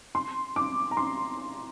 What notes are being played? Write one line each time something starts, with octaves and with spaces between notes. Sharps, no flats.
C6
D6
A#5
C6